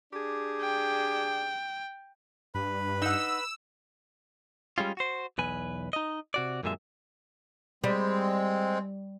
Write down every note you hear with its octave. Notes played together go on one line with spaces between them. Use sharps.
D4 G4 G#4
G5
G2 B4 B5
D#4 F#5 E6
G3 G#3 C#4 F4
F#4 C5
B1 E2 B4 G#5
D#4 D#5
C3 F#4 D5
F#2 A#2 D3 G#3 E5
G3 G#3 C4